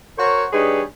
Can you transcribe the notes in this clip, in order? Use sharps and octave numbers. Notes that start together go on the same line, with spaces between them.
F#4 A#4 C5 C#5
G3 D4 D#4 G#4 B4 C#5